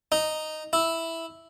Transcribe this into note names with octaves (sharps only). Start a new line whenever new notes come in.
D#4
E4